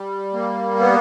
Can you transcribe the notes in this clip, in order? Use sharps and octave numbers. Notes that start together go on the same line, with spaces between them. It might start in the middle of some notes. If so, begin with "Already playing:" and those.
Already playing: G3
A#3
B3